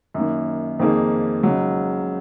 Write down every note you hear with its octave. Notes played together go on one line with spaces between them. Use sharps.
F#2 D#3 A#3
F2 D#3 A#3 D#4 G#4
C#2 C#3 F#3